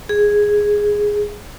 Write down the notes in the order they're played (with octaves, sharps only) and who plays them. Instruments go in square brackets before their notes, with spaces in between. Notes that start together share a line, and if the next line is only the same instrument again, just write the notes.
[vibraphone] G#4